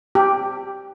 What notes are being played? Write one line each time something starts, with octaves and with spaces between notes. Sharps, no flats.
G4